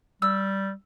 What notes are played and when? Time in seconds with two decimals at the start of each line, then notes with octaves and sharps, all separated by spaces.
0.22 G3 E6